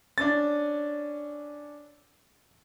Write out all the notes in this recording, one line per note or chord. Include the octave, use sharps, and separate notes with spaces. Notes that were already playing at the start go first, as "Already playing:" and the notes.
C#4 D4 A6